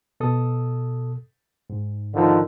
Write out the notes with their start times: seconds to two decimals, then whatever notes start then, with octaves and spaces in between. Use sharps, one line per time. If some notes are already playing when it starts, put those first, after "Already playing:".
0.20 B2 A4 D#6
1.70 G#2
2.13 D3 D#3 F3